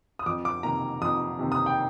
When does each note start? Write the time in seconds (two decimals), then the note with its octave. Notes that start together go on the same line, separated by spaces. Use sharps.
0.19 D#6
0.26 F2 D6
0.45 D6
0.63 C3 D#3 A#3 A#5
1.02 F2 D#6
1.39 C3 D#3 A#3
1.52 D#6
1.66 G5